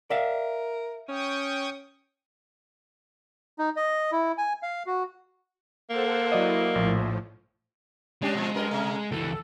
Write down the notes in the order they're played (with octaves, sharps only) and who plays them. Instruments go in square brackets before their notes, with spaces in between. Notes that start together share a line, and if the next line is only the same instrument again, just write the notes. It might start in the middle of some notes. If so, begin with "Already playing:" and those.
[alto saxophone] A#4 [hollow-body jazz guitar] D5 E5 F5
[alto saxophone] C#4 [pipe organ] G5 C#6 D#6
[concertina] D#4
D#5
E4
G#5
F5
F#4
[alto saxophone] A#3 [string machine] A4 C5 F#5
[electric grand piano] F#3 D5 D#5 [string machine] E4
[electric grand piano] A#1 [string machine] A2 F3
[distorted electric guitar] G#3 [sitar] C#4 D4 G4
[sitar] B2 F3
F#2 A#4 D#5
C3 A3
[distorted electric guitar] C#2 E3 [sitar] A4